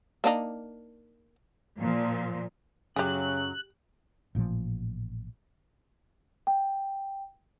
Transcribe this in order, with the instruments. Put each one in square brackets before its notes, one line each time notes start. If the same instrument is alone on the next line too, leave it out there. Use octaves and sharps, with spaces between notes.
[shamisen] A#3 D4 D#4
[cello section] A#2 F3
[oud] F#2 F#3 [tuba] C#3 [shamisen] G4 G#4 [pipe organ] F#6
[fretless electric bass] A1 A#2 C#3 F3
[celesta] G5